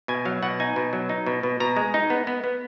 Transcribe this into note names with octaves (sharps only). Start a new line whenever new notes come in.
B2 G#5
F#3 F5
B2 F#5
D#4 G#5
B2
F#3
D#4
B2
B2
B2 A#5
G#3
D#4
B3
B3
B3